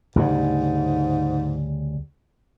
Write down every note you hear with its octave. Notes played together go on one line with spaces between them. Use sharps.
D2 G#2 C#3 G3